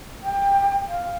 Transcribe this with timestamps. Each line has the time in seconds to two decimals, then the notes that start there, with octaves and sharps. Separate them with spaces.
0.23 G5
0.88 F5